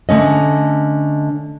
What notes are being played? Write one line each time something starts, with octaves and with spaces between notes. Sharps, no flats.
D3 A3 C#4 D#5